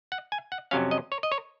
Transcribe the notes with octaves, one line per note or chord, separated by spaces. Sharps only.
F#5
G#5
F#5
F2 C3 F#3 C#4 F5
D#5
C#5
D#5
C#5